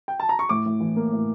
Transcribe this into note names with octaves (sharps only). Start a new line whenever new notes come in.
G5
A5
A#5
C#6
A2 D6
A2
E3
A#3
A2